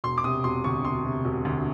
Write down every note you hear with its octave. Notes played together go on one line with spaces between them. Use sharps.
E1 C6
D6
C3 D#6
E1 C6
D2 C#6
E1 C6
C3
E1
D2